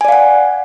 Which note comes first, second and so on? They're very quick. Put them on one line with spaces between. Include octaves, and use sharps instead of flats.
G#5 D5 F5 F#5